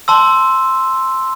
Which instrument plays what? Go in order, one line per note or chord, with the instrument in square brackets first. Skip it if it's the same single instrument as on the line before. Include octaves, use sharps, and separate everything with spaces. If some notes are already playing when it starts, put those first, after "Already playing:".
[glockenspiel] A5 C6 E6